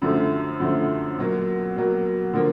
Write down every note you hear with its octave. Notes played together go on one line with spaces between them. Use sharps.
F#2 D3 F3 A3
F#2 D3 F3 A3
B2 F#3 A#3
B2 F#3 A#3
D3 F3 A#3